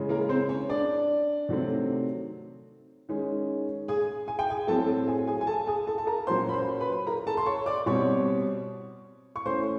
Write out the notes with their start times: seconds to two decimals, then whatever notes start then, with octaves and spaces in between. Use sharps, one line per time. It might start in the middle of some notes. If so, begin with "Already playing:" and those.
Already playing: C#3 E3 G#3 C#4
0.09 A#3 A#4
0.29 C4 C5
0.49 C#4 C#5
0.69 D4 D5
1.49 C3 D#3 F#3 A3 C4
3.09 D#3 G#3 C#4
3.88 G#4 G#5
4.28 G#5
4.39 G5
4.50 G#4 G#5
4.67 A2 F#3 A3 C4 A4 A5
5.08 G#4 G#5
5.27 G#4 G#5
5.41 G#5
5.47 A4 A5
5.67 G#4 G#5
5.87 A4 A5
5.98 A5
6.07 A#4 A#5
6.27 A#2 F#3 A#3 C#4 C5 C6
6.49 B5
6.53 C5 C6
6.80 B4 B5
7.07 A#4 A#5
7.27 A4 A5
7.37 C6
7.46 C#5 C#6
7.66 D5 D6
7.86 B2 G3 C4 C#5 C#6
9.36 C#6
9.46 E3 A3 C#4 C5 C6